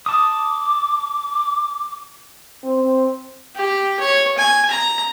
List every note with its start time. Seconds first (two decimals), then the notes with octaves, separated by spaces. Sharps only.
0.06 A5 D6 D#6
2.64 C4
3.55 G4
4.00 C#5
4.38 G#5
4.70 A#5